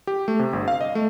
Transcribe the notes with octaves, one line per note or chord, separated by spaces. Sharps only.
G4
A3
C3
G1
F5
D#5
A3